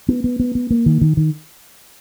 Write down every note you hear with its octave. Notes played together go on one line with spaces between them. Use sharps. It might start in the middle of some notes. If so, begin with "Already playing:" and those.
B3
B3
B3
B3
A#3
D#3
D#3
D#3